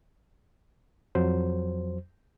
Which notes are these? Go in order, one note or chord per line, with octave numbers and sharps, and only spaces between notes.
F2 F#3 C5